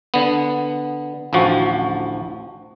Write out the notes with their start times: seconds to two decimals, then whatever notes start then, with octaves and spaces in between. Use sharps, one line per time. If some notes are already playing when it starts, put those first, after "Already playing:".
0.14 D3 B3
1.33 A1 D2 F3 F#4